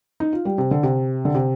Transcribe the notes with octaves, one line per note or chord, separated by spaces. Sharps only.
D#4
F4
G3
C3
D3
C3
D3
C3